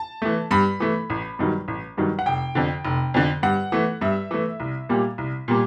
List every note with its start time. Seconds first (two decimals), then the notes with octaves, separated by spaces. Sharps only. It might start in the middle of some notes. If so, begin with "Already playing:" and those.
Already playing: A5
0.22 E3 A3
0.51 G2 B5
0.80 E3 A3
1.10 A1
1.39 G2 D#3 F#3
1.68 A1
1.97 G2 D#3 F#3
2.19 F#5
2.26 F1 G5
2.55 F2 D3
2.85 F1
3.14 F2 D3
3.43 G2 F#5
3.72 E3 A3
4.01 G2 E5
4.31 E3 A3
4.60 C2
4.89 A#2 G3 A#3
5.18 C2
5.48 A#2 G3 A#3